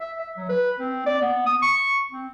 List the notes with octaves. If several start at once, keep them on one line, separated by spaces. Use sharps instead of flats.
E5
E5
F#3
B4
C4
D5
B3
D#6
C#6
C4